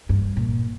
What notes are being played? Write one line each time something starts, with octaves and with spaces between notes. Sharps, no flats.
G2
A#2